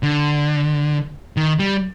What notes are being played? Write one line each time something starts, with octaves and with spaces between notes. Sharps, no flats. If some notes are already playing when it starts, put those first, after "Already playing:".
D3
D#3
G3